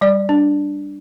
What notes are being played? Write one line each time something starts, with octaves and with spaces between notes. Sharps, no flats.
G3 D5
D4